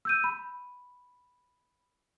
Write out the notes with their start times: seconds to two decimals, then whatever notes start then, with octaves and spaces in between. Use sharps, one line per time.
0.05 E6 G6 D#7
0.24 B5